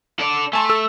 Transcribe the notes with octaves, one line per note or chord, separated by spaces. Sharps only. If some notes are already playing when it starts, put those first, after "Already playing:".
A4 D5
A3 G#5 A5 C6
A4 E6